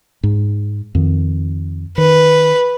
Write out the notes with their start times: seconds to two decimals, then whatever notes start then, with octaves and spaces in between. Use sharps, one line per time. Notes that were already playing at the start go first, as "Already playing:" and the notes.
0.23 G#2
0.95 F2 D#3
1.98 D#3 B4